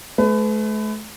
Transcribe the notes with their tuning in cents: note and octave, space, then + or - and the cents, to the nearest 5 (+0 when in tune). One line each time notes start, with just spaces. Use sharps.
A3 -40 B4 +30